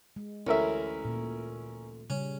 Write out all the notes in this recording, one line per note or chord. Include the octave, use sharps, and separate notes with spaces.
G#3
A1 D2 C#4 E4 A#4 E5
A#2
C#3 G3 C#4